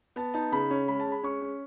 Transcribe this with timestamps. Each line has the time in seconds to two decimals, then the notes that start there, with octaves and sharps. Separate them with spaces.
0.16 B3 A5
0.34 D#4 A5
0.52 C#3 B5
0.70 C#4
0.88 G#3 B5
1.00 A5
1.07 G#3
1.12 B5
1.23 C#4 C#6
1.42 C#4